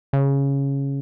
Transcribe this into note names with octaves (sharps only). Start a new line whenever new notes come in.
C#3